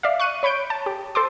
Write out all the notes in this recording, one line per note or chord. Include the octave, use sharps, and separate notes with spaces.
D5 E5 F5
C#6 F#6 D#7
C#5 B5 C#6 G6 D7
A5
G4
A4 C5 C6 D6